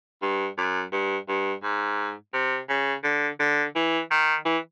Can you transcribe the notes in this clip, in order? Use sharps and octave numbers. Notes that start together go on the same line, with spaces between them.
G2
F#2
G2
G2
G#2
C3
C#3
D3
D3
E3
D#3
E3